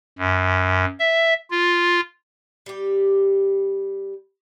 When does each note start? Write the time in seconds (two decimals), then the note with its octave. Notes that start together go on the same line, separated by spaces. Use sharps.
0.18 F#2
0.99 E5
1.51 F4
2.66 G3 G4